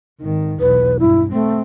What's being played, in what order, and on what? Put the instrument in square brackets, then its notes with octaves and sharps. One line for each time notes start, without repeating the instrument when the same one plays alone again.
[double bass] G#1 D#3
[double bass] B1 E2 [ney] B4
[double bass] G2 [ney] E4
[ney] A3 [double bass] C4